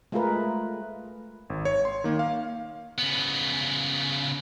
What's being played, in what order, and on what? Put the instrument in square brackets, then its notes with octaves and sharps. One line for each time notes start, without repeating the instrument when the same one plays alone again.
[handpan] G#3 A3 F4 G#4 A#4 B4
[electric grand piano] G#1
C#5
C6
D#3 A#3
F5
[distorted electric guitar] C#3 B3